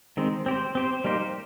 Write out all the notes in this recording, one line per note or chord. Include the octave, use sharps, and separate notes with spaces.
D#3 G#3 C4
C4 G4 C5
C4 G4 C5
G3 A#3 D#4 G4 C5